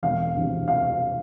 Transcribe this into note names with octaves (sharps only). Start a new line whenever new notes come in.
E1 F5
D2 C3 E3
F5